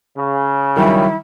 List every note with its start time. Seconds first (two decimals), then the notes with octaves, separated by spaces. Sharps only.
0.17 C#3
0.76 D#3 F#3 G3 E4